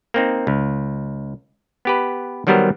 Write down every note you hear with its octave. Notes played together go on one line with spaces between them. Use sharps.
A#3 C4 D#4
C#2
B3 G4 B4
D#3 F#3 G3 B3 A#4 C5